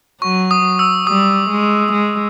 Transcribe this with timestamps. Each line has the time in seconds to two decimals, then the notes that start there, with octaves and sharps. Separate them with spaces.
0.22 F#3 C#6
0.51 D#6
0.79 E6
1.07 G3 D#6
1.50 G#3
1.93 G#3